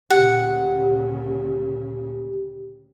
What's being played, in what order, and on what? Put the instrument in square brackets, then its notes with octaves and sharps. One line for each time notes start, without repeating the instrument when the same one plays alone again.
[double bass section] D2 A#2 C#3 [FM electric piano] G4 [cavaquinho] F#5